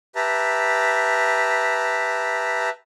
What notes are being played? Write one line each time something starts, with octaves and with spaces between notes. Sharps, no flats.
G4 B4 E5 A5 A#5